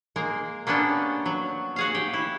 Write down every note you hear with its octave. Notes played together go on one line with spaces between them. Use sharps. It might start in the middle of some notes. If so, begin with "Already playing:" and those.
G#3 A#3 A#4
A#3 B3 C#4 D4 G4
F#3
F#4 G#4 F5
G4
E4